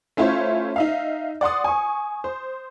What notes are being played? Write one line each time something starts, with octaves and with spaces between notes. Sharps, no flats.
A3 C#4 E4 F4 C5 C#5
D#4 E5 F5
D5 F#5 C6 D#6
G#5 C#6
C5